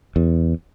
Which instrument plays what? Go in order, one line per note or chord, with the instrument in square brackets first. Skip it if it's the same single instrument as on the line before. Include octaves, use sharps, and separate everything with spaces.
[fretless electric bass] E2